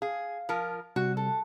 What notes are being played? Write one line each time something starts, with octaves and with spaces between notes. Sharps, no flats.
G#4 F5
F3 F4 A#4
C3 G3 F#4
A4